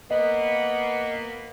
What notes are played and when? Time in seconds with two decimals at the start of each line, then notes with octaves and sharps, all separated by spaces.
0.11 A#3 B3 D#5